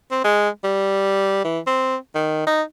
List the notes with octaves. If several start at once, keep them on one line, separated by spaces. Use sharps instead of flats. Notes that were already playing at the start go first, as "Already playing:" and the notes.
C4
G#3
G3
E3
C4
D#3
D#4